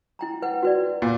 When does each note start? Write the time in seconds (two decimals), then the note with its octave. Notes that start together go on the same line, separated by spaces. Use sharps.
0.19 E4 G5 A#5
0.42 B4 F#5 G5
0.63 F#4 B4 D5
1.02 A#2